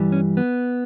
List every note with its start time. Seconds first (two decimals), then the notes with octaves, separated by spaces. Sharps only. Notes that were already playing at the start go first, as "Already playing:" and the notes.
Already playing: G2 E3 G3
0.12 C#4
0.37 B3